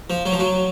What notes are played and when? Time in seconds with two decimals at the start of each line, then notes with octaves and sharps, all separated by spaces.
0.10 F3
0.26 F#3
0.33 F3
0.39 F#3